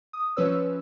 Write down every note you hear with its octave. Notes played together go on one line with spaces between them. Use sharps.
D#6
F3 C#4 B4 C#5 E6